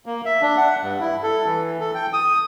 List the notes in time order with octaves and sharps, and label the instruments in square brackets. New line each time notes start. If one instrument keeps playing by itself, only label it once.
[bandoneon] A#3
E5
D4
F#5
G2
E4
A4
E3
A4
G5
D#6